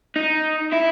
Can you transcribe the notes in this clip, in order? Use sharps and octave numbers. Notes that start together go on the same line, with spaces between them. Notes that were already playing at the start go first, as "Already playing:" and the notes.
D#4
E4